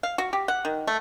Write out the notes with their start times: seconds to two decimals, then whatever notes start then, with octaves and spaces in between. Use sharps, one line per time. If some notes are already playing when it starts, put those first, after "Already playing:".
0.03 F5
0.18 F#4
0.33 G4
0.48 F#5
0.65 D#3
0.87 A3